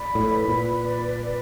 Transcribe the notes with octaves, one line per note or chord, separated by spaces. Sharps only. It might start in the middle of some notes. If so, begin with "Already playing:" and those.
Already playing: D5 B5
A2
B4
A#2
D5
B4